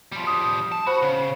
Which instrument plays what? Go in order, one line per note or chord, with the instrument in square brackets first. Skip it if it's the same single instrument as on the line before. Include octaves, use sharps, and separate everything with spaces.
[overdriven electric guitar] F3 G3
[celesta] D#6
[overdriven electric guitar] A5
[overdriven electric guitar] F#4 [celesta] C5 B5
[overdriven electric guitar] C#3